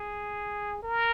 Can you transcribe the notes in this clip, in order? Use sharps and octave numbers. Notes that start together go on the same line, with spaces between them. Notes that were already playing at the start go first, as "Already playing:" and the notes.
Already playing: G#4
A#4